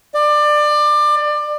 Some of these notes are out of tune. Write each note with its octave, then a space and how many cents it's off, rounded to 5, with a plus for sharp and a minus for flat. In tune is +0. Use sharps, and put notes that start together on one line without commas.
D5 +25